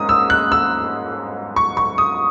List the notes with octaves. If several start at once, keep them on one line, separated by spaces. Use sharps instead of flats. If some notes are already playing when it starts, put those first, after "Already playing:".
Already playing: G#2 A#3 C#4 D#6
E6
F#6
E6
C#6
C#6
D#6